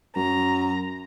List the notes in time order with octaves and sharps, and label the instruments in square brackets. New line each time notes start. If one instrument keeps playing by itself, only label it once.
[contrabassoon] F#2 [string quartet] A#5